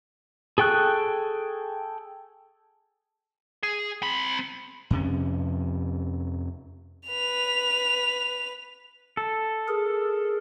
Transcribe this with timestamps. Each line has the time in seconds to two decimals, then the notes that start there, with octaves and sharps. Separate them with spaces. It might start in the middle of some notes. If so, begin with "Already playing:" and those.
0.58 G#4 A4 G5 C#6 F#6
3.63 G#4
4.03 C4 B5
4.90 F2 C3 C#4
7.08 B4 F7
9.17 A4
9.68 G#4 A#4